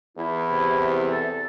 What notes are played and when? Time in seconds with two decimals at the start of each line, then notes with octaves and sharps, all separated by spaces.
0.17 E2 E4
0.50 C3
1.10 A4